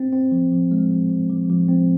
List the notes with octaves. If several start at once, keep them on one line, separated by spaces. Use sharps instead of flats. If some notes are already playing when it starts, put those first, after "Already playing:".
Already playing: C4
C4
F3
F3
G#3
F3
F3
F3
F3
C4